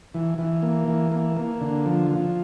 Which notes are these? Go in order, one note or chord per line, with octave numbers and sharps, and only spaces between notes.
E3
E3
A#3
E3
A#3
A#3
D3
F3
F3